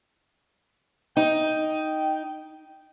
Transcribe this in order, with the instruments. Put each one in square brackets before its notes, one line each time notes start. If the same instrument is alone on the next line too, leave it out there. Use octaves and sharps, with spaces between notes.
[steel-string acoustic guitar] D#4 [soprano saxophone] G5